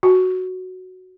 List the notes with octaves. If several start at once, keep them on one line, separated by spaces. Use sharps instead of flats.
F#4